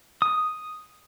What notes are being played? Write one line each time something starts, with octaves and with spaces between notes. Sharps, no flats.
D#6